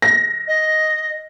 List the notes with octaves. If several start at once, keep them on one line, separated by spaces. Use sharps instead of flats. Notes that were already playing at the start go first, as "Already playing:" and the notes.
A#6
D#5